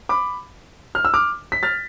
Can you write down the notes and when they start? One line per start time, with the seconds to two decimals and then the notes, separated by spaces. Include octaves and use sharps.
0.09 B5 D6
0.95 F6
1.05 E6
1.14 D6 F6
1.52 B6
1.63 F6 A6